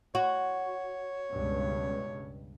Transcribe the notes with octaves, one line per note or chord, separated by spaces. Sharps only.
F#4 C#5
C#2 G2 B2